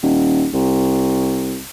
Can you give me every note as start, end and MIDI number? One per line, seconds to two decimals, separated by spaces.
0.02 0.47 27
0.53 1.60 36